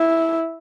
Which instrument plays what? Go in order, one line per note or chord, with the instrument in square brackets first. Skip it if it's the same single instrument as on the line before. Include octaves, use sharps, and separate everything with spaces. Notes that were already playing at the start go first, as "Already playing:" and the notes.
Already playing: [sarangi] E4